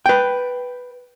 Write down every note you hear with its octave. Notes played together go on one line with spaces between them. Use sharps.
B4 G5